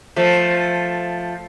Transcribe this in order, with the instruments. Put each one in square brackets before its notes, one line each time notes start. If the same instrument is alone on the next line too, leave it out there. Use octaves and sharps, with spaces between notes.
[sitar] F3 A3